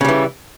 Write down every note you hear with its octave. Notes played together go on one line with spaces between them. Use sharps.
C#3 E3 G3